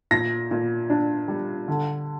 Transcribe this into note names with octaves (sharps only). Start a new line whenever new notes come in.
A#2 A#6
A#2
D4
G3
D3